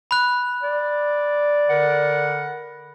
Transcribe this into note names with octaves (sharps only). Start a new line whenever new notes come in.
B5 F#6
D5
D3 A#4 F#5